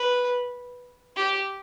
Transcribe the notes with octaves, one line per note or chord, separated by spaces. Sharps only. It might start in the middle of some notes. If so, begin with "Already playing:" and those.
Already playing: B4
G4